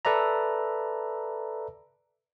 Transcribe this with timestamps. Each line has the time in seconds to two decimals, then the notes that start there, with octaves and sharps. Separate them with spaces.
0.05 A4 B4 D5 E5 A#5